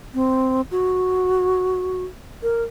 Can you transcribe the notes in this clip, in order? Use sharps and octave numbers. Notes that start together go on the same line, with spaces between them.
C4
F#4
A#4